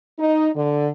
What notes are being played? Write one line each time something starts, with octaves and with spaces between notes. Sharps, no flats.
D#4
D3